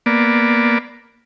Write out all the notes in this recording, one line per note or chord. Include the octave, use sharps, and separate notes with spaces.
A#3 B3 D5